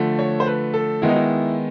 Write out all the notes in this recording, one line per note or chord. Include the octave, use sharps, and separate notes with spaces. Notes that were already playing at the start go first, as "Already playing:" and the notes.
Already playing: D3 F3 A3
C#5
C5
B4
A4
D#3 G#3 B3 E4
D#4
E4